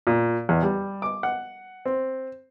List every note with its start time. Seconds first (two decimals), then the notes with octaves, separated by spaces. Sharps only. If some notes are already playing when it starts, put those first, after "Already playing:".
0.07 A#2
0.49 E2
0.63 G3
1.02 D6
1.23 F#5
1.85 C4